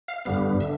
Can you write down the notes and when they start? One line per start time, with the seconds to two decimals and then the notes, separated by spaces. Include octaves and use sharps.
0.08 F5
0.25 G2 D3 G3 B3 F5
0.60 D3 E5